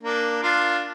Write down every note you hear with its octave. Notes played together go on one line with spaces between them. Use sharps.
A#3 D4
D4 F4